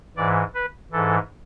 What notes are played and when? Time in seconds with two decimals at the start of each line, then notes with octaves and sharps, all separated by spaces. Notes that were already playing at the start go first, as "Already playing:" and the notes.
0.17 G#2 E3 D5
0.55 B4
0.92 G#2 E3 A4